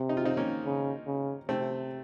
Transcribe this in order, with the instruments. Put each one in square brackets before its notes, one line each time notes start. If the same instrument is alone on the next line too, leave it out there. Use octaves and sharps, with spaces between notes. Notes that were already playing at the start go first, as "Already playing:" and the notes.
Already playing: [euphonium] C3
[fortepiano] D#4
F4
C4 D#4
A#3 C#4
[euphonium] C#3
C#3
[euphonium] C3 [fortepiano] A3 C4